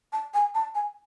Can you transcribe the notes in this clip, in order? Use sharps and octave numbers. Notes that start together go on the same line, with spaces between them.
A5
G#5
A5
G#5